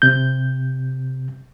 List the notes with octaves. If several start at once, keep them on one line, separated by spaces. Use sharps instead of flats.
C3 G6